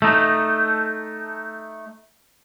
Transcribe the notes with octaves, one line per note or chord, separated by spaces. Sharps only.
A3 D#4